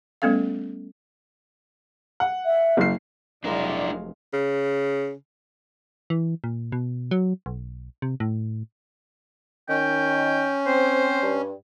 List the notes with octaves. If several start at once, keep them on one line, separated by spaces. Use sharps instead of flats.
G3 A3 B3 C#4 A4 F5
F#5
E5
F#1 C7
F1 F#3 G#3 D4 E4 A#4 D5 F5
C#3
E3
A#2
B2
F#3
B1
C3
A2
D#3 C#4 G5
C4 C5
G2